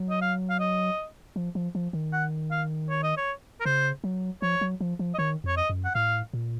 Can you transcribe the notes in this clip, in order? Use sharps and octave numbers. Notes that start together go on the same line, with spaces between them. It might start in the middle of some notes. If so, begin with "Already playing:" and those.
Already playing: F#3
D#5
F5
F5
D#5
F3
F3
F3
D#3
F#5
F5
C#5
D#5
C#5
A#4
C#3 C5
F#3
F3 C#5
F#3
F3
F3
D#5
D#3 C#5
F2 C#5
D#5
F#2
F#5
A2 F5
A#2